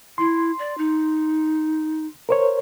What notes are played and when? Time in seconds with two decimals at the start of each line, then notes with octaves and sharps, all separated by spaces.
0.18 E4 C6
0.59 D5
0.78 D#4
2.29 A#4 C5 C#5